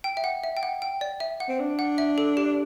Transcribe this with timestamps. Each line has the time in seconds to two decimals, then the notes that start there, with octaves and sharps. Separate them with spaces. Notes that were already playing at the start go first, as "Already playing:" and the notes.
0.04 G5
0.17 E5
0.24 F#5
0.44 E5
0.57 G5
0.63 F#5
0.82 G5
1.01 D5
1.20 E5
1.40 F#5
1.48 C4
1.60 D4
1.79 F#5
1.98 E5
2.18 A4
2.37 G4